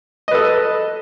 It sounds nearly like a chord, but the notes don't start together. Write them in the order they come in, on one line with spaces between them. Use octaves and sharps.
D#5 B4 A4